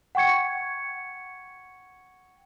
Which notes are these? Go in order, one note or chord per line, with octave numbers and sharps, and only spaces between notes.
F#5 G5 C#6 G#6 C#7